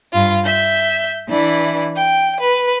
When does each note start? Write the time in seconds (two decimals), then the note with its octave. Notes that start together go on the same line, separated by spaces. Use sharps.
0.12 G2 F4
0.45 E5 G6
1.28 E3 D4 E4
1.96 G5
2.39 B4